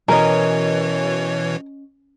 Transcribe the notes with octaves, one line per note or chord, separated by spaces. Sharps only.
B2 E3 C#4 A#4 C#5 D#5